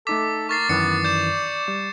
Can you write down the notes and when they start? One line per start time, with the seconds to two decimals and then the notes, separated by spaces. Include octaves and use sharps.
0.07 A3 D#4 A4 D6 B6
0.49 A#4 C#6 A6 C7
0.69 F#2 D#3 E3 B3 C#7
1.05 D5 G6 E7
1.68 G3